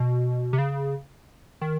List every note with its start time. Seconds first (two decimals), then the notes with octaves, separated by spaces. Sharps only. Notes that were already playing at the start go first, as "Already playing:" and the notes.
Already playing: B2
0.53 C3
0.59 C#3
1.61 D#3